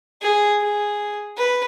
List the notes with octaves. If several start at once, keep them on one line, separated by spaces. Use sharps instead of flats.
G#4
G#4
B4